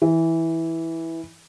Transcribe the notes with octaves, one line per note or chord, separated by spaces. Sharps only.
E3